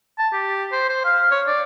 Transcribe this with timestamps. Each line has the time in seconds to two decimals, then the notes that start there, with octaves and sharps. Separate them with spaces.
0.19 A5
0.33 G4
0.72 C5
0.89 C5
1.05 F5
1.31 C#5
1.47 D5